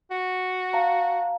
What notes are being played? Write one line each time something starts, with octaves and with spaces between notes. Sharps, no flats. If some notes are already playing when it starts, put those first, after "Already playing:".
F#4
F5 A5 A#5